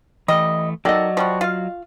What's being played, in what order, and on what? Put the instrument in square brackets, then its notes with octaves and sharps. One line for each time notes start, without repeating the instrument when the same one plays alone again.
[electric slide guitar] E3 A3 [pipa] G3 D#5
[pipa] D#3 A4 [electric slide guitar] F#3 F#5 [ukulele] D5 D#5
[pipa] F3 G3 F#4
F4 F5